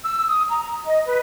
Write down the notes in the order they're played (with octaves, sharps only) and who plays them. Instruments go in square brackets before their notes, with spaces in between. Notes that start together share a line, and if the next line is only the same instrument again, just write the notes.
[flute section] E6
D#6
A#5
D#5
B4